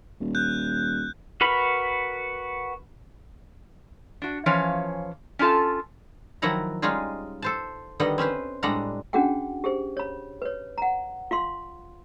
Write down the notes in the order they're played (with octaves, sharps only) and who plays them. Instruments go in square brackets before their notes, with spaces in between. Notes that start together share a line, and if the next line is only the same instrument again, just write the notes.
[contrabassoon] D#1
[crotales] F#6 G6
[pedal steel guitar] F#4 A#4 B4 B5
[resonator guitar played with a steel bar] D4 F#4
E3 F3 C#4 C#5 F5
C#4 D4 F4 A4 A5
[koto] D#3 F3 F#3 E4 F#5 A#5
G3 G#3 C#4 D#4 F4 G#4
A4 C5 A5
D3 D#3 G3 B3 D#5 F#5
C4 C#4 B4 C5
A2 G3 G#3 D4 F#5 A#5
[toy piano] C#4 D4 F#4 G#4 F#5 G5
G4 G#4 C5
C#5 B5
B4 C#5
F#5 A#5
F4 F5 C6